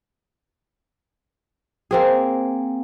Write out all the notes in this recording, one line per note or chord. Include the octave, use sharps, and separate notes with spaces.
A#3 C4 G#4